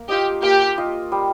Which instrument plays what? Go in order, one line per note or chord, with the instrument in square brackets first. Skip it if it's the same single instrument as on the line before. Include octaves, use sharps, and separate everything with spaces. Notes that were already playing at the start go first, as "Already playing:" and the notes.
Already playing: [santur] A#3
[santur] F4 D#5 [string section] G4
[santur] A#3 [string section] G4
[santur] F4 D#5
G3